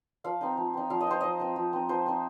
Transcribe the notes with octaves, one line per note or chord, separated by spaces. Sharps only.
F3 F5
C4 D#4
F3
C4 D#4
F3 F5
D#5
C4 D#4 C5
F3 D#5
C4 D#4
F3
C4 D#4
F3 C5
C4 D#4